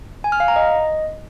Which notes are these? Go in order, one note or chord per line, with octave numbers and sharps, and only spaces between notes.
G#5
F6
F5
A#5
D#5